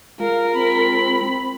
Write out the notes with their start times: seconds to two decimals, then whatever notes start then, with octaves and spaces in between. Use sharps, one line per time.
0.20 G#3 F4 A#4 F5
0.54 C4 B5